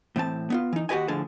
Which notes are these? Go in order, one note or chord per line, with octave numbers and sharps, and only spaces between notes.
A2 E3 C4 A5
B3 D#4 F4
E3 D#4
D#2 F#4 G4 B4 D#5 G#5
D2 A2 D3 F3 G#4 A5